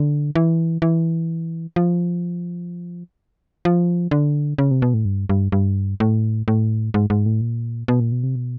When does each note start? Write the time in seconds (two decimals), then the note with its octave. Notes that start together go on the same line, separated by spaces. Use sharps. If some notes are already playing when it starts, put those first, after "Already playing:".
Already playing: D3
0.35 E3
0.82 E3
1.76 F3
3.65 F3
4.11 D3
4.58 C#3
4.71 C3
4.82 B2
4.94 A2
5.05 G2
5.29 G2
5.52 G2
6.00 A2
6.48 A2
6.94 G#2
7.10 G#2
7.26 A2
7.41 A#2
7.88 B2
8.00 A#2
8.12 B2
8.23 C3
8.35 B2